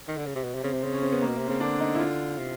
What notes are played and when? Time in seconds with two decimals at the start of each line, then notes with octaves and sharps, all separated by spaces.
0.08 D#3
0.17 D3
0.26 C#3
0.35 C3
0.44 B2
0.55 C3
0.63 C#3 C4
0.73 C3
0.83 C#3 C4
0.93 C#4
1.02 C4
1.12 B3
1.22 A#3
1.27 B2
1.38 C3
1.47 C#3 C4
1.60 D3 D4
1.80 D#4
1.95 E4
1.99 F4
2.38 C3